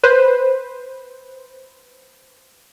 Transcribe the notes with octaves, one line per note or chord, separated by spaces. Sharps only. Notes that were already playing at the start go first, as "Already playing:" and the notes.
B4 C5